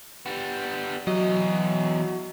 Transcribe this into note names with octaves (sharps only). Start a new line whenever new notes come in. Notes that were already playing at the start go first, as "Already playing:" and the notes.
G3 B3
E2 F#3 D#5